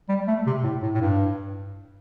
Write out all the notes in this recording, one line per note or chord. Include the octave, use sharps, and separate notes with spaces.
G3
A3
C3
A2
A2
A2
G2